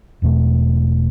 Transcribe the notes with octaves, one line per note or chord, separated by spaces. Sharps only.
E1 E2 B2 A3